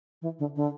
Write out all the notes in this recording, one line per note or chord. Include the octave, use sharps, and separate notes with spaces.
E3
D3
D3